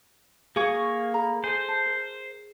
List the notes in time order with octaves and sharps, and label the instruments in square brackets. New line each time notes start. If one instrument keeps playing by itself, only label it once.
[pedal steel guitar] A#3 C#6 [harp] G#4 [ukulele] F5
[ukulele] A4 A#5 B5
[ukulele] A4 D#5 G#5 [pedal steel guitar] C5
[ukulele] A5
A#4